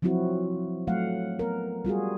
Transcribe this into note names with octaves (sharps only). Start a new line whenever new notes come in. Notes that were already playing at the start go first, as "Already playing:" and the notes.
F3 F#3 C4 E4 F#4
F#3 A3 F5 F#5
B3 A#4
G3 F4 F#4 G#4